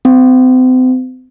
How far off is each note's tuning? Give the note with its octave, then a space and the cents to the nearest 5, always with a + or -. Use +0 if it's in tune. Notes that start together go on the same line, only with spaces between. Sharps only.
C4 -40